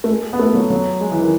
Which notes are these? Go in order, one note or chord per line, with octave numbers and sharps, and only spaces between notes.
A3
G#3
B3
A3
F#3
F#3
G#3
E3
D#3